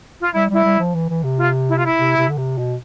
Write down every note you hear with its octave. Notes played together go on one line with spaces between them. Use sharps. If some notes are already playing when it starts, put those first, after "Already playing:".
F4
G3 E4
G3 E4
G3
F3
E3
E3
C3
F4
E4
F4
E4
C3
C3
D3
C3
B2